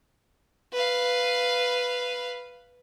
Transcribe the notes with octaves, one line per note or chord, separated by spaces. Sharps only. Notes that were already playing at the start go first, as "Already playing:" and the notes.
B4 F5